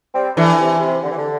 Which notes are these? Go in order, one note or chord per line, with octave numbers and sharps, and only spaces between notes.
G3 C4
E3 A3 D4
C3
C3
D3
E3
D3